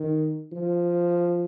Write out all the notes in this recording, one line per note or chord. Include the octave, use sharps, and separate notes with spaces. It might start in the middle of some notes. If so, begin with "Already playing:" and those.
Already playing: D#3
F3